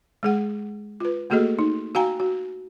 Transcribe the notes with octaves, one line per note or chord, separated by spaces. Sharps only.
G#3 G#4 F#5
F4 B4
A3 A#3 F#4 G#4 A4 D#5
D#4
F#4 F5 G5 G#5 A#5
F#4